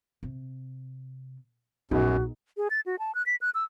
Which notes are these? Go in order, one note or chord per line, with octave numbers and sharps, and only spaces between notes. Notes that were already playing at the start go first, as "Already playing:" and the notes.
C3
A#1 F#2 B3 D#4 F#4 G#4
G#4
A6
F#4
A5
F#6
B6
F#6
E6